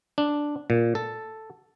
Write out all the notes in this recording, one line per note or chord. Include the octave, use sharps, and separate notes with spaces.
D4
A#2
A4